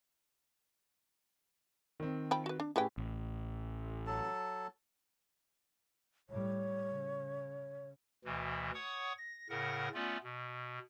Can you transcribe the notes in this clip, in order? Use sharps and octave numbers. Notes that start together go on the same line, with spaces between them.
D#3 C4
F3 G5 B5
F#4 B4
D4
A2 C#3 G4 B4 G5 G#5
A1
F#3 A4 A5
A2 G3 C#5
C#3
D2 B2 E3
C#5 F#5 C#6 D#6
A#6
A2 C#3 A#4 F#5 A#6
A3 B3 C#4 F4 D5
B2